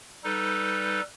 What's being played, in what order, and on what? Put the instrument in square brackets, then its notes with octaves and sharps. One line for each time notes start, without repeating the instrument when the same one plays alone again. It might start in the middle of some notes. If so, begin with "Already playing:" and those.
[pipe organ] G3 D#4 A4 B4